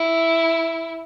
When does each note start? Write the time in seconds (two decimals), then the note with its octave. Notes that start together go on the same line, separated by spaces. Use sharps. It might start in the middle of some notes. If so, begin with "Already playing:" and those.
Already playing: E4